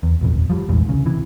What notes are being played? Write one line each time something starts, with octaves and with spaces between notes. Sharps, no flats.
E2
D#1 G#1 F2
F3 G3
A#1 E2 G#2
C2 C#3
C3 E3